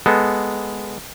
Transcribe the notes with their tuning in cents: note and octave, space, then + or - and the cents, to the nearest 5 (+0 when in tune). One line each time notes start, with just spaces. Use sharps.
G#3 +0 B3 +0 A4 +0